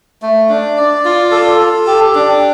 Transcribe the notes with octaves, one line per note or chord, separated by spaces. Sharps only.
A3
D4
D5
F4
A4
A4
G4
D4